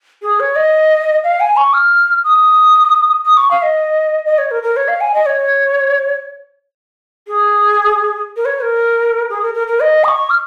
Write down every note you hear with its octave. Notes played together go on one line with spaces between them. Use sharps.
G#4
C#5
D#5
F5
G#5
C#6
F6
D#6
D#6
C#6
F5
D#5
D#5
C#5
A#4
A#4
C#5
F5
G#5
D#5
C#5
G#4
A#4
C#5
A#4
G#4
A#4
A#4
A#4
D#5
D#6
C#6
F6